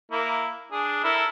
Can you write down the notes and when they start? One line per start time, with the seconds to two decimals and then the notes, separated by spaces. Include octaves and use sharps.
0.12 A#3 E4
0.72 D4 G#4
1.04 E4 A4 A#4